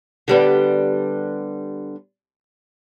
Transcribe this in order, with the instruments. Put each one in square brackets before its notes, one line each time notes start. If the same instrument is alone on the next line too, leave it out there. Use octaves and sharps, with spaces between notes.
[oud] D3 G3 B3